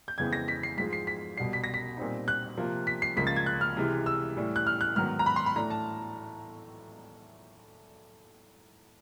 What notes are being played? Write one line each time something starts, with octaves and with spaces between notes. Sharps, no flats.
G6
F2 C#3 E3 G#3 B3 G#6
A#6
B6
C7
G#2 F3 G#3 B6
C7
B6
C2 B2 G3 C7
B6
A#6
B6
A#2 G3 C4 D#4
F#6
C3 F3 A#3
B6
C7
C#2 C#3 F3 A#3 B6
A6
G#6
F#6
F6
C3 E3 G#3
E6
A2 E3 G3
F#6
F6
F#6
G#2 D#3 F#3 B3 F6
A#5
B5
C6
B5
A2 E3 A3 D4 A#5
A5